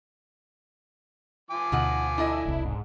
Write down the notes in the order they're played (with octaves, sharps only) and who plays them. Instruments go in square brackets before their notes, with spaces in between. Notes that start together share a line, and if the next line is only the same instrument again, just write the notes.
[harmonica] F3 G#5 D6
[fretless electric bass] D2 B2 D3 [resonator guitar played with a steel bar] D#4 F4 F#5
[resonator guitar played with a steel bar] D4 A4 D#5 [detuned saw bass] E4
[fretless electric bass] E1 C2
[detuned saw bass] G#2